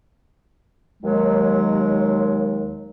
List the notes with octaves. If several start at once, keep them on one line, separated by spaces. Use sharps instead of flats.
D#2 F#3 G#3